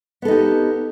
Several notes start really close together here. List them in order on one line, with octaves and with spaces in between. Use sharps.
B3 A4 D#4 G4